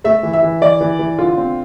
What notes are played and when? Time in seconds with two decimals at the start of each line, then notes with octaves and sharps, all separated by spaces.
0.04 A3 E5
0.23 E3
0.33 E5
0.43 E3
0.61 E3 D5
0.81 E3
0.99 E3
1.19 D3 F4
1.37 C4